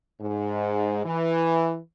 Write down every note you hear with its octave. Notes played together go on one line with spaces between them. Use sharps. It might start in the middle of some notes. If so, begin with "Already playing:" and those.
G#2
E3